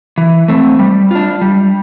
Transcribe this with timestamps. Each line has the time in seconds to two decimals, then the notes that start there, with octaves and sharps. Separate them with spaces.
0.18 E3
0.48 A3 C4
0.79 G3
1.11 D4 F4
1.42 G3